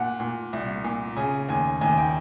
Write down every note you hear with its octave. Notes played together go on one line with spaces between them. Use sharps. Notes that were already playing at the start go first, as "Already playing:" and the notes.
Already playing: A#2 F#5
A#2
C2
A#2
C#3 G#5
D#2 G#5
D#2 G#5
G5